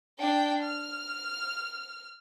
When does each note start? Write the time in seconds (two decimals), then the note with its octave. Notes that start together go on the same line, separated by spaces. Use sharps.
0.19 D4 G5
0.63 F6